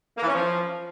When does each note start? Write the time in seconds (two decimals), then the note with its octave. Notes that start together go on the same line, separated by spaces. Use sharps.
0.17 A#3
0.23 E3
0.28 C#4
0.33 F3